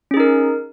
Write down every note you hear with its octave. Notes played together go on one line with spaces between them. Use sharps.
C#4 D#4 G#4 A#4